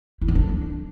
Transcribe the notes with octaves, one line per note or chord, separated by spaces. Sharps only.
E4
B3
D4